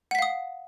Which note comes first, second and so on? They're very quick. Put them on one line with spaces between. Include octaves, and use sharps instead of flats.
F#5 B6 F5 D#6